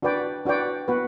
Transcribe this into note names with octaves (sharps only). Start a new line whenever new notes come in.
D4 F#4 B4 D5 G5
D4 F#4 B4 D5 G5
B3 F#4 B4